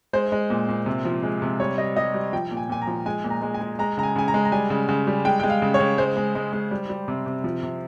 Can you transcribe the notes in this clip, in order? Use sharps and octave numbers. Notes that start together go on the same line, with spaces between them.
G#3 C5
G#3
A#2
A#2
C3
F3
G#3
C3
G3 C#5
G3 D#5
G3 D#5
G3
F3 G5
A#2
G#5
A#2 G#5
A#5
F3
G#3 G#5
A#2
A#5
G#3
G#5
G#3
G#3 A#5
C#3 A#5
G#5
C#3 G#5
A#5
G#3
A#5
G3 G#5
C#3
C#3
G3
G#3 G5
G#3 G5
F5
C#3
C#5
C#3
G#3 C5
G#3
G#3
G#3
G3
G3
C3
C3
F3
C3